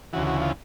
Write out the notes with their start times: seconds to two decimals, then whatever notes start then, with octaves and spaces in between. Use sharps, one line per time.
0.13 D2 C#3 E3 F#4
0.27 F#4
0.42 F4